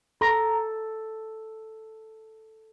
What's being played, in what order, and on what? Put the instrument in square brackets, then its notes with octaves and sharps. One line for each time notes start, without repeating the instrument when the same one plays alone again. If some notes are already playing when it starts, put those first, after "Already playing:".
[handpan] A4 [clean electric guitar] A#5